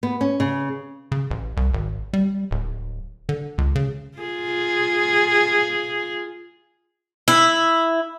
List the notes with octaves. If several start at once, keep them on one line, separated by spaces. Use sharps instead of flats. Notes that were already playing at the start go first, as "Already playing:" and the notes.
B3
C#4
C#3
C#3
A1
C2
G#1
G3
D1
D3
C#2
C#3
F4 G#4
E4